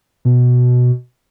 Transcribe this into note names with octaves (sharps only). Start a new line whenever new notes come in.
B2